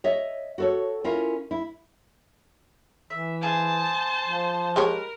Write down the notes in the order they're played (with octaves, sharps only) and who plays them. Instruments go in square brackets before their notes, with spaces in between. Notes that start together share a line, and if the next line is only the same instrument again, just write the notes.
[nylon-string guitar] C#5 D#5 E5
F#4 A4 C#5
C#4 E4 F4 A#4
E4
[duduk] E3 [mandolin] E5
[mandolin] G#4 F5 [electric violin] C5 A5
[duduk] F3
[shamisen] G#3 G4 C#5 [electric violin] A#4 [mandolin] B4